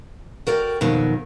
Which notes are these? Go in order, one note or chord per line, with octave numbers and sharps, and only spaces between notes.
F#4 A#4 D5 G5
F2 B2 D#3 F#3